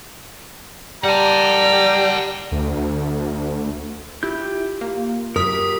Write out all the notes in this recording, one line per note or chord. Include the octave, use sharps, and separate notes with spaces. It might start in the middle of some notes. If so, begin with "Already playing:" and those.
G3 F#5 A5 A#5
D2
E4 F4 G4 G6
A#3
F#2 G4 A#4 D#6 B6